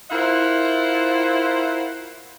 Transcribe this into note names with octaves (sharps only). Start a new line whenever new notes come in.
E4 F4 A#4 C5 E5 F#5